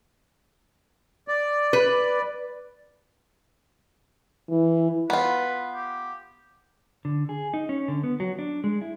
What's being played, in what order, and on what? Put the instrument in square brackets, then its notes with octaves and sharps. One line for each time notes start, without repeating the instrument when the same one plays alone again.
[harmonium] D5
[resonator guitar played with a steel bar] B4
[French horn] E3
[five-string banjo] B3 F4 [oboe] B4
[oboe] G4
[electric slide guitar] D3
G#4
D#4
C#4
D3
B3
F#3
D4
G#3
E4